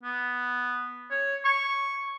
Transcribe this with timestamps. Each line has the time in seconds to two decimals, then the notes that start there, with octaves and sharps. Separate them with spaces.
0.03 B3
1.11 C#5
1.45 C#6